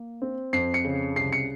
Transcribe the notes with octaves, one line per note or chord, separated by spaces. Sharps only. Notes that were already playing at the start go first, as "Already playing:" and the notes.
Already playing: A#3
C4
F2 C7
C#7
C#3
C2 C7
C#7